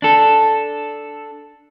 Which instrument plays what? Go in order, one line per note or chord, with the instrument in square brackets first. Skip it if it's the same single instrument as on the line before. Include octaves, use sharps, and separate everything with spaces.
[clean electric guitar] D4 A4